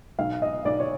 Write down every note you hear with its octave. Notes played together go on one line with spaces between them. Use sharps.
B1 F5
D#5
B1 D5
C#5